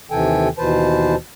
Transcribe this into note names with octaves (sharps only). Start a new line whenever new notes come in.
D#2 C3 E3 A4 G5 G#5
D#2 B2 E3 B4 C5 A5